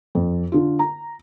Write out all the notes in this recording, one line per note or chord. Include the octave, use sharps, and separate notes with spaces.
F2
D3 F4
A#5